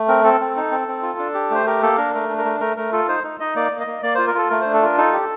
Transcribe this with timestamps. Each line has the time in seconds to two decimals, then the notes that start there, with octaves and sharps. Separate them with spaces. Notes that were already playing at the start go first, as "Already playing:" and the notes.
Already playing: A3
0.08 C4 A#4
0.24 C4 A4
0.41 C4
0.56 D#4
0.71 C4
0.88 C4
1.02 F4
1.19 D4
1.34 G4
1.50 A3 C5
1.66 G4 A#4
1.82 A#3 A4
1.97 D4 A#4
2.14 A3 A#4
2.29 D4
2.38 A#4
2.45 A3
2.60 A3 A#4
2.76 A3 A#4
2.92 F4 A4
3.08 D#4 C5
3.24 D#4
3.40 D#4 D#5
3.56 A#3 D5
3.72 A#3
3.80 D#5
3.87 A#3
4.03 A#3 D5
4.15 F4 C5
4.27 A#4
4.35 F4 A4
4.50 A3 A#4
4.61 D4 C5
4.73 A4
4.82 F4 A#4
4.98 D#4 A4
5.13 G4